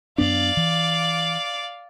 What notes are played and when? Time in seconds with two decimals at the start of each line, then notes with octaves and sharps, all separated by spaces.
0.18 F#2 B3 D4 D5 F5
0.57 E3